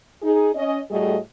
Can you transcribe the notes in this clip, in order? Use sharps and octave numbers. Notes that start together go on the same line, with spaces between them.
D#4 G#4
C#4 D#5
A2 G3 A3 F#4 G#4 D#5